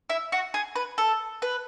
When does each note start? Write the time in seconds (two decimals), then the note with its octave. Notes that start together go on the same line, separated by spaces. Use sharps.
0.10 E4
0.32 F#4
0.54 G#4
0.76 B4
0.98 A4
1.42 B4